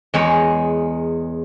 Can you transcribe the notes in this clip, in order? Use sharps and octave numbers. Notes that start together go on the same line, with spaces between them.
E2 G#3 C#5